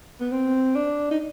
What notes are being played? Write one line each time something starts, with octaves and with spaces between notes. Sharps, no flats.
B3
C4
D4
D#4